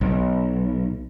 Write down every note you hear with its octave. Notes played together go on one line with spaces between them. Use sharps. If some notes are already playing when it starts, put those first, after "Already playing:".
B1